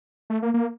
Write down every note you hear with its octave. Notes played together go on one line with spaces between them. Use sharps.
A3
A#3
A#3